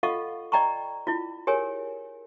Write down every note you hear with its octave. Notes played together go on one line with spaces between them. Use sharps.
F4 A4 D#5 F5 F#5 C#6
D5 D#5 G5 A#5 B5 C#6
E4 F4
G4 G#4 A#4 C#5 G#5